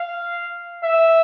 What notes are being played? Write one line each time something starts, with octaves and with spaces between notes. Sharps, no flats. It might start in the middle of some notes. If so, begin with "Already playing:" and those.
Already playing: F5
E5